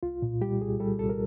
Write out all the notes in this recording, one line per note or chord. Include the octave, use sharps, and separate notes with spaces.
C2 F4
A#2
G3 G4
C2 G#4
G3 A4
C2 A4
A#4